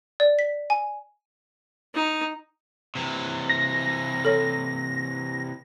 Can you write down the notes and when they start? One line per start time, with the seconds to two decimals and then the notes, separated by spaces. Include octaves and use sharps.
0.20 D5
0.39 B6
0.70 G#5
1.94 D#4
2.95 C3 E3
3.50 A#6
4.25 A4 C#5